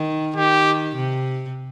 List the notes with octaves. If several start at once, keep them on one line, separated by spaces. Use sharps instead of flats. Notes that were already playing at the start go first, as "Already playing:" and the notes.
Already playing: D#3
D#3 G4
C3